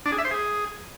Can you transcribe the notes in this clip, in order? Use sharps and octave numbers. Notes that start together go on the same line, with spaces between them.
D4
G#4
E5
C5
G#4